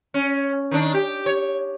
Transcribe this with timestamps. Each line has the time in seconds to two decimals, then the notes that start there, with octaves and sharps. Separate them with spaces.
0.14 C#4
0.71 D#3 D4
0.94 G4
1.26 C#5